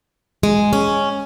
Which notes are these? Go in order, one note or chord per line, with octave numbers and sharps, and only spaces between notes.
G#3
C#4